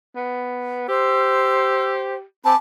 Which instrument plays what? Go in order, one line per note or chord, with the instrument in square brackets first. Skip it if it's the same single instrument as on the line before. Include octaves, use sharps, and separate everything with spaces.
[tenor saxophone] B3
[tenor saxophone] G4 [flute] C5 [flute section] E6
[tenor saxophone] C4 [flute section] G#5 B5 D6 [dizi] A5